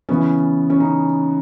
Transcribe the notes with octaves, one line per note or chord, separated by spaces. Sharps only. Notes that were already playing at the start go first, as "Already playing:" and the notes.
C#3 E3 B3 C#4
C#4
C#3 D#4